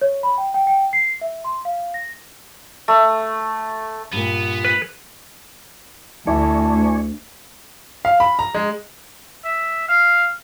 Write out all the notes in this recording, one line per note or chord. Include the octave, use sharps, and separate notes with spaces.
C#5
B5
G5
G5
G5
C7
E5
C6
F5
A#6
A3
G2 A#2 B3
B4
D2 E4 D5 G#5 A5 C#6
F5
B5
A#5
G#3
E5
F5